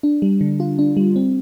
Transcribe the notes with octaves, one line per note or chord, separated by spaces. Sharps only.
D4
G3
D3
F4
D4
G3
C4